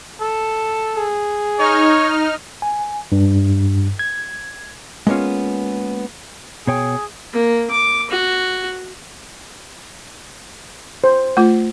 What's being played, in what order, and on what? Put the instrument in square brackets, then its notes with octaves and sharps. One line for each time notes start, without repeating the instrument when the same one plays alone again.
[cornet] A4
[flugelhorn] G#4
[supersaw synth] D#4 F6 [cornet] C#5
[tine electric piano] G#5
G2
G#6
[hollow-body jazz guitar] G#3 A#3 B3 C#4 F4
[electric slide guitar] B2 C#5 G5 [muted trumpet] G#4
[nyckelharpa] A#3
D6
F#4
[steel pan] C5
[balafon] A3 F4